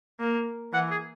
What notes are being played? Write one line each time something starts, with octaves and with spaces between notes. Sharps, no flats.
A#3
E3 F#5
G#4